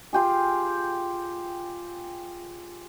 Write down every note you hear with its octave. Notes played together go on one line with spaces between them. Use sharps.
F4 G4 G#4